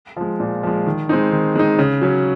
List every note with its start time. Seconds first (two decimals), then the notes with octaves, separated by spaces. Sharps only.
0.16 F3 G#3
0.40 A#2
0.63 F3 G#3
0.87 D#3
1.09 G#3 C4 D#4
1.31 D#3
1.55 G#3 C4 D#4
1.79 C#3
2.02 F#3 C#4